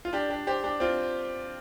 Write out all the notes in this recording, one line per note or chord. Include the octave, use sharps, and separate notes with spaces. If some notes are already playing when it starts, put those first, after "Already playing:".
F4
D4 G4
D4 G4
G4 C5
D4 G4
C4 F4